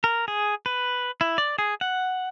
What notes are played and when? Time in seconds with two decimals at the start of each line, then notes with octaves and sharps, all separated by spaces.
0.04 A#4
0.28 G#4
0.66 B4
1.21 E4
1.38 D5
1.59 G#4
1.81 F#5